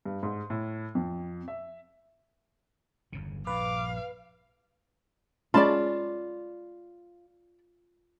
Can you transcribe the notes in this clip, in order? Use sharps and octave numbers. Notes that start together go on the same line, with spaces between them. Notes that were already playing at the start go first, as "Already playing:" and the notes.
G2
G#2
A2
F2
E5
G1 E2 C#3
A#1 G2 B4 F5 D6
G#3 C#4 F4 D5 A5 B5